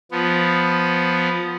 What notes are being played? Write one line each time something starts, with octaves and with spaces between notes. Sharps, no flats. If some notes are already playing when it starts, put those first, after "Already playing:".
F3 B3